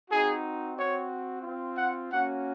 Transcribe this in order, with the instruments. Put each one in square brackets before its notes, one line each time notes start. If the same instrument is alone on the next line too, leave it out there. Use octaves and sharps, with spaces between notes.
[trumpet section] C4 D#4 F#4 G#4
C4 F#4 C#5
C4 F4
F#5
A#3 C#4 F#4 F#5